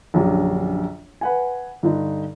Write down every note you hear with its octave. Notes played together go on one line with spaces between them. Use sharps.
A#1 F#2 D3 G4
B4 F#5 G#5
G2 D3 D#4